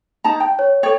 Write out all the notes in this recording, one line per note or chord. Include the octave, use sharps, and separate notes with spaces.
D#4 A5 A#5
G5
C#5
A4 C#5 D5 G5